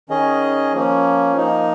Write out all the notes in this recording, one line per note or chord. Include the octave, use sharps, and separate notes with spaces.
D#3 C#4 G#4 D#5
F3 A#3 C#4
F3 A#3 D#4